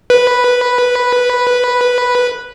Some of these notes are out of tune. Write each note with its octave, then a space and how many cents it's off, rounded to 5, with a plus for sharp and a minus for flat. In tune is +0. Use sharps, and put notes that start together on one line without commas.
B4 -5